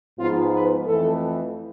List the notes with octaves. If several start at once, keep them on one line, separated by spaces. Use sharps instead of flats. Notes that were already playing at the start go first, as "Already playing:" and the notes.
G#2 F3 B3 F4
B4
F2 E3 A3 A4